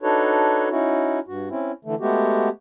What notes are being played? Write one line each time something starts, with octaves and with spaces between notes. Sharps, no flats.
D4 D#4 F#4 A4 B4 C#5
C#4 D#4 E4 F#4
G2 F#4
C4 C#4 E4
D3 E3 A3
G#3 A3 B3 F#4 G4